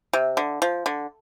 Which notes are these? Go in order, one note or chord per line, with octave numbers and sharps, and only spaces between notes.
C3
D3
F3
D3